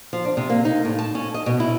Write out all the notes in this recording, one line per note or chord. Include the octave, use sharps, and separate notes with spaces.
F3
D4
C3
A#3
D#4
A2
A5
C#4
D#5
B2
E4